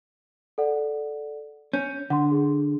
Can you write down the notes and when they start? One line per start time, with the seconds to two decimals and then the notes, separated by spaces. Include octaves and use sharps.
0.58 A4 D5 F#5
1.73 C#4 G6
2.10 D3 F#5 C6
2.31 G#4